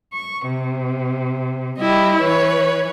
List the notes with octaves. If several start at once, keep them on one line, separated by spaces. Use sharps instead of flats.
C#6
C3
G3 E4 G4 D#5
E3 B4 C#5